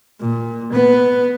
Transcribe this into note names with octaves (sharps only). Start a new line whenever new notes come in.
A#2
B3